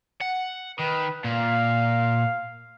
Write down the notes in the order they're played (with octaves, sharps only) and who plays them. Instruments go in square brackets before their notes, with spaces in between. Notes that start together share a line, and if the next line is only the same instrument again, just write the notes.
[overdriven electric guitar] F#5
[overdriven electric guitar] D#3 [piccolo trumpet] B4
[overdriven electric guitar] A#2 [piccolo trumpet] F5